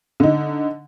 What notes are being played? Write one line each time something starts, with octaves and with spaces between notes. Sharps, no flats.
D3 D#4